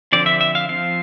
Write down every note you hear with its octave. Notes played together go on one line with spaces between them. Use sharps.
D3 F3 C4 D5
E5
E5
F5
F3 C4 F5